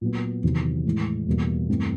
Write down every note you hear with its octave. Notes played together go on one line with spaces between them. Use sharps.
A#2 F#3 B3
E2 C3 D#3 F#3
A2 E3 G#3
E2 B2 G3 A#3
G2 E3 A3 C4